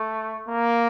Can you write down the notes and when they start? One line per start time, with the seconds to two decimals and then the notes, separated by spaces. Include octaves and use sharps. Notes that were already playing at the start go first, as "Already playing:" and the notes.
Already playing: A3
0.49 A#3